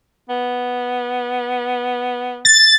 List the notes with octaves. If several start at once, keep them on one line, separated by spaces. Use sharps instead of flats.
B3
A6